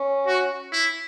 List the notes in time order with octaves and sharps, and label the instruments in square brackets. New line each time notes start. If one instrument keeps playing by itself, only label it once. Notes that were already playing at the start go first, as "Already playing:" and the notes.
Already playing: [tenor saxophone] C#4
[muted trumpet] F#4
E4